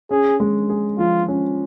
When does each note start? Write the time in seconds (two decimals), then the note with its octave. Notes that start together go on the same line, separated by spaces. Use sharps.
0.11 C#4 G#4
0.40 G#3
0.69 G#4
0.98 F3 F4
1.28 C#4